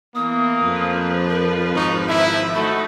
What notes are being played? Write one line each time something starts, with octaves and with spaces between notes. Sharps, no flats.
E3 A#3 B3 D#6
F2 F3 B4
A#4
G#1 D#4 C#6
E4 E5
A3 D#4 F#4 B5